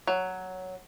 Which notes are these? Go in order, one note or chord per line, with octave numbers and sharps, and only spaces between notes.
F#3